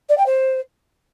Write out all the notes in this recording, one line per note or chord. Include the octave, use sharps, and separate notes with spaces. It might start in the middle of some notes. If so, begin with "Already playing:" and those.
D5
G5
C5